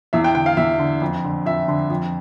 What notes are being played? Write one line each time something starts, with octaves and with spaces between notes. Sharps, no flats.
E2 E5
G5
D3 G5
F5
E2 E5
D3
F2
D3
F2 E5
D3
F2